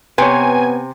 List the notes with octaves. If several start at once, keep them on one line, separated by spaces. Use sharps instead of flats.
C3 B3 B4 C#5 G#5